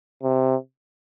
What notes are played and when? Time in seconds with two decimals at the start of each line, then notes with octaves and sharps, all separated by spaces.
0.23 C3